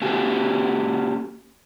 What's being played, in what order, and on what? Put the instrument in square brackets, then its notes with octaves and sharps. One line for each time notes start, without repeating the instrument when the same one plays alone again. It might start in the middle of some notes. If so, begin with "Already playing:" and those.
[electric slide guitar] A#3 C#4 F#4 G4 G#5 A5